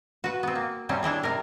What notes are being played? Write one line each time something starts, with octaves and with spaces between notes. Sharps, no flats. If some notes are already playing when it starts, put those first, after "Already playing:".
F#4 B4
B3 C4
A#3
C3 G3 C4 C#4
D4 E4 G4 G#4
C3 G3 A#4